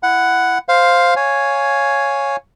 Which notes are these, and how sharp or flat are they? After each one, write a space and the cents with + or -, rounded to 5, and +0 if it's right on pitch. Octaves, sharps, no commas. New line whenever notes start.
E4 +15 F#5 +0
C5 +0 F5 +5
C#5 +0 F5 +0 G#5 +0